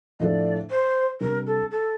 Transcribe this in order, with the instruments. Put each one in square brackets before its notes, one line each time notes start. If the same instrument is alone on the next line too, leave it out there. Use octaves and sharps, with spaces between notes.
[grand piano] A2 F3 A3 D4 A4 [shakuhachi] D5 D#5
[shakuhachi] C5
[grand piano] C3 G3 D4 [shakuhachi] A#4
[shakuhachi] A4
A4